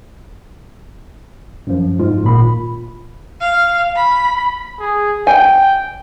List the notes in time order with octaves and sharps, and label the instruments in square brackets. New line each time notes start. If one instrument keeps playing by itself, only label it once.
[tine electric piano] F#2 F3
G#2 F4
G#1 A#2 B5
[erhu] F5
B5
[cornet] G#4
[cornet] G5 [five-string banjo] G#5